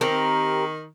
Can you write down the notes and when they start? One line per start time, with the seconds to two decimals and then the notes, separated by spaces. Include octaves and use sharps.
0.01 D#3 C4 G4 A#4